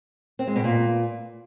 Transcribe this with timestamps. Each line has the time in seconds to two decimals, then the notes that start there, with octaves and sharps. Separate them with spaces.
0.39 C4
0.47 G#3
0.56 B2
0.64 A#2